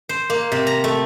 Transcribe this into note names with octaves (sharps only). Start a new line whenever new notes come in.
C5
A#3
C3
A#5
A3